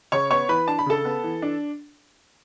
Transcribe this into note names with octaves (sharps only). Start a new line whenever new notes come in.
C#3 C#5 C#6
B3 C#5 C#6
E3 B4 B5
D4 A5
B5
C#3 A4 A5
B3
E3
D4